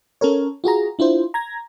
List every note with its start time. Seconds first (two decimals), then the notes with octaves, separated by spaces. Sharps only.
0.21 C#4 A4 A#4 C#5
0.64 F4 F#4 G#4 A#5
0.99 D4 E4 F4 C5
1.34 A#5 G#6 A#6